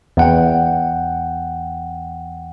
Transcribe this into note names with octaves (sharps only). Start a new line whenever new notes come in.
E2 F#5 G5